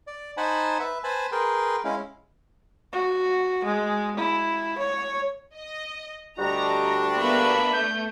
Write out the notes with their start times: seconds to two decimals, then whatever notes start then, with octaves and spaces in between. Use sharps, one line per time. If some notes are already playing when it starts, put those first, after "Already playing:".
0.07 D5
0.37 D#4 C5 F#5 G#5 A5 B5
0.80 B4 E5
1.04 B4 C5 G#5 A5 B5
1.32 G#4 A#4 B4 G5 C6
1.85 G#3 C#4 E4 F5
2.93 F#4
3.64 G#3
4.17 E4
4.78 C#5
5.55 D#5
6.38 D2 G3 D4 F#4 D#5 A#5
7.18 A#3 B3 E5 B5
7.73 A3 G6